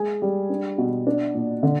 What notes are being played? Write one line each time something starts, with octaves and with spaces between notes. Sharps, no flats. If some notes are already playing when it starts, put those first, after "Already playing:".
Already playing: G#3 G#4
G3
D4
B2
D4
A#2
D3